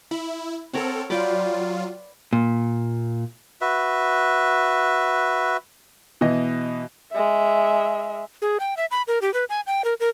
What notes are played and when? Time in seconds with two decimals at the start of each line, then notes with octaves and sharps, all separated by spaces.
0.11 E4 B5
0.73 C4 A4 A#4 C#5 F#5
1.10 F#3 F4 B4 D5 G5
2.33 A#2
3.61 F#4 B4 E5
6.21 B2 E3 D#5
7.12 G#3 E5
8.42 G#4
8.60 G5
8.77 E5
8.91 B5
9.08 A#4
9.22 G4
9.34 B4
9.49 G#5
9.67 G5
9.85 A#4
10.00 A#4